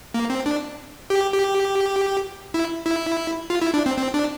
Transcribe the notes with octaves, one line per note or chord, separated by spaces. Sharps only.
A#3
C4
D4
G4
G4
E4
E4
F4
E4
D4
C4
C4
D4